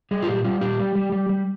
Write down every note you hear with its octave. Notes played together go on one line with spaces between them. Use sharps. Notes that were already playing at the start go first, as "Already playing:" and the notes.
G3 G#4
F4
A#2 G4
G3 F4
A#2 G4
G3
G3
G3
G3